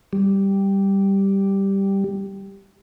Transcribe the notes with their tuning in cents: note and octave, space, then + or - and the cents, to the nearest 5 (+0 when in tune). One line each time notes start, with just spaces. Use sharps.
G3 +0